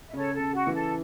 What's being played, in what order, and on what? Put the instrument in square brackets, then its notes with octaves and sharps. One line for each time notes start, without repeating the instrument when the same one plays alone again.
[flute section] E5
[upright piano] C#3 [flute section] A4 C#5
[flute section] A4
[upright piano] C#3
[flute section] F#4
[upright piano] E3
[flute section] A4